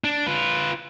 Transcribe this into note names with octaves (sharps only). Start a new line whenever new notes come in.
D4
F4 B4